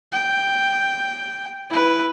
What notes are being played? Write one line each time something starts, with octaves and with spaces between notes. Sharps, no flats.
G5
E4 B4